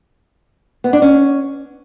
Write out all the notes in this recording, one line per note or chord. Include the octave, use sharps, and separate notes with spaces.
B3
D4
C#4